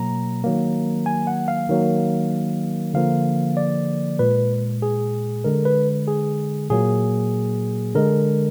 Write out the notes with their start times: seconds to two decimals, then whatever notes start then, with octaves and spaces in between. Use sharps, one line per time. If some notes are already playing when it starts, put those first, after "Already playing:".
Already playing: B2 F#3 A#3 A#5
0.44 D#3 F#3 A#3
1.06 G#5
1.27 F#5
1.48 F5
1.69 D#3 F#3 A#3
2.94 D3 F3 A#3 F5
3.57 D5
4.19 A#2 G#3 B4
4.82 G#4
5.44 D3 G#3 A#4
5.65 B4
6.07 G#4
6.70 A#2 F#3 A#3 G#4
7.95 D3 G#3 A#4